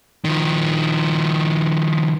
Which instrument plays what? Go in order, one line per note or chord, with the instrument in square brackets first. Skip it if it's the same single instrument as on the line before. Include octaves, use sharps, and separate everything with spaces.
[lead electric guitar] D#3 F3